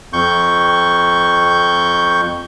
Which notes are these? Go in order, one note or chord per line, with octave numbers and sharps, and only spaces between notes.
F2 C#6 G6